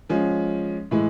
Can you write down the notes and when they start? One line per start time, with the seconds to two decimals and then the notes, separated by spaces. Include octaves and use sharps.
0.10 F3 G#3 C#4
0.91 A2 E3 G#3